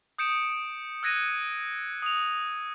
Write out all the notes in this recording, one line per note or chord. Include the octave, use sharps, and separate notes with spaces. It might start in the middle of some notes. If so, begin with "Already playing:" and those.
D#6 G6 C#7 D7 E7
E6 F#6 G#6 A#6 C#7 D#7
D#6 F7